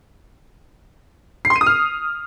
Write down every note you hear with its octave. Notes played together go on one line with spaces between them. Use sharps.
C7
C6
D#7
D#6
F6